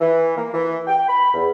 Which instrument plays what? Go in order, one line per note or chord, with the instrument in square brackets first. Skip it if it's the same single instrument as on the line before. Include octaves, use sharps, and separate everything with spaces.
[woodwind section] E3
A#3
E3
G5
B5
E2